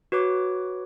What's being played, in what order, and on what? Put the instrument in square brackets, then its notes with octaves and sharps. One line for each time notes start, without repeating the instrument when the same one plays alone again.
[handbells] F#4 B4 C#5 D6